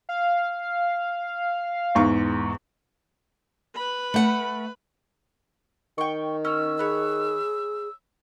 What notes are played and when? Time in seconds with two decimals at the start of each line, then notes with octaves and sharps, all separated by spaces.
0.09 F5
1.95 E2 G#2 C#6
3.75 B4 B5
4.14 A3 F#5
5.98 D#3 G5 C#6
6.45 C#4 E6
6.79 G#4 B4 C#5